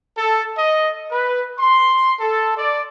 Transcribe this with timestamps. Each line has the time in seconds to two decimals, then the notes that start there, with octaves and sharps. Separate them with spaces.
0.18 A4
0.58 D#5
1.11 B4
1.59 C6
2.20 A4
2.57 D5